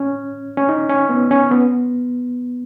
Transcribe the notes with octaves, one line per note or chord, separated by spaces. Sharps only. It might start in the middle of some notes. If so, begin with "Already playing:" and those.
Already playing: C#4
C#4
D#4
C#4
B3
C#4
B3